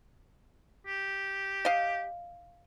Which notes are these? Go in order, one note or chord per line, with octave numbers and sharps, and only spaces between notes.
G4
D#5 F5